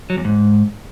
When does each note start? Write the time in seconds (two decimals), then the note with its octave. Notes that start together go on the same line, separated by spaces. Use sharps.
0.10 F#3
0.17 E2
0.24 G#2